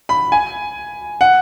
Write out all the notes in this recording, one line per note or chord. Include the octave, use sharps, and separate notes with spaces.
B5
G#5
F#5